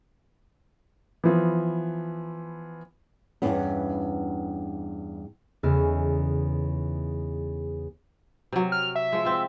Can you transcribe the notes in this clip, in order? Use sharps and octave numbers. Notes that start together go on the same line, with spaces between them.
E3 F3 B3
E2 G2 B3 C#4
E2 C#3 B3 D#4 A4 F6
C3 F#3
F6
E5
F3 G#3
C4 F4